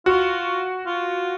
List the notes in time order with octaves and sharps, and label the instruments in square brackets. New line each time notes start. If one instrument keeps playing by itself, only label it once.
[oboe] F4 [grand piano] F#4
[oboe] F4